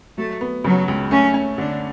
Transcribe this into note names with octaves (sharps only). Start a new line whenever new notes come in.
F#3 A3
B3
C#3 F#3
C#2
A3 C#4
C#4
D3 D4